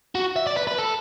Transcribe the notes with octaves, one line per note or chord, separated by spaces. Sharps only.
F#4
E5
D5
B4
B4
A4